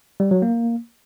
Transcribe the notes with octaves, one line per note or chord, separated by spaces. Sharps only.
G3
F#3
A#3